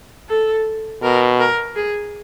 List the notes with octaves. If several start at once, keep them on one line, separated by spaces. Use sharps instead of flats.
A4
B2 A#4
A#4
G#4